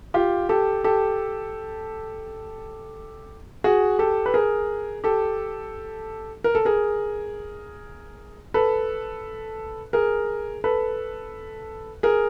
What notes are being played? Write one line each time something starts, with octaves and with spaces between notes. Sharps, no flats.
F4 G4
G4 A4
G4 A4
F#4 G#4
G4 A4
B4
G#4 A#4
G4 A4
A#4
A4
G#4 A#4
A4 B4
G#4 A#4
A4 B4
G#4 A#4